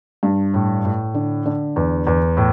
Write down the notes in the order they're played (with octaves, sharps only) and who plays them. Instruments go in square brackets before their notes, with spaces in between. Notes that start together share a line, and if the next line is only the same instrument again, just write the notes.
[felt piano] G2
A2
A2
D3
D3
E2
E2
A2